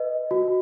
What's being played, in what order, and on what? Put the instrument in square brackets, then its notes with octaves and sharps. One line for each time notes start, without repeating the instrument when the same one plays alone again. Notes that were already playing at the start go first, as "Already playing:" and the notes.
Already playing: [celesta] B4 D#5
F#4